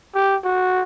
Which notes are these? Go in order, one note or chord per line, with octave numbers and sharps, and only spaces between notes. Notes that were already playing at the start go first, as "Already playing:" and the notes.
G4
F#4